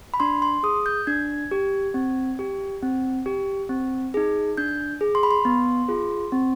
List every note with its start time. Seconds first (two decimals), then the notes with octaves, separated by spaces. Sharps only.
0.14 B5
0.20 D4 C6
0.42 C6
0.63 G#4 D#6
0.86 G6
1.07 D4 G#6
1.51 G4
1.94 C4
2.39 G4
2.82 C4
3.26 G4
3.69 C4
4.14 D#4 G#4
4.57 D4 G6
5.01 G#4
5.15 C6
5.23 B5
5.31 C6
5.45 B3
5.88 F4 G#4
6.32 C4